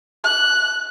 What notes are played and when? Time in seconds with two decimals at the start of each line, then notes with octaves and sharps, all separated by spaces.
0.24 F#6